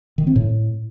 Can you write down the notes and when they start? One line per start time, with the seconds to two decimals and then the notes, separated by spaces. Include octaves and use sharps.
0.18 D#3
0.27 C4
0.36 A2